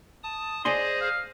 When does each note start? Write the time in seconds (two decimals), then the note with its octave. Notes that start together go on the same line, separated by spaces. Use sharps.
0.23 A5 D#6
0.65 G#4 C5 D5 D#5 G#5 C6
1.01 F5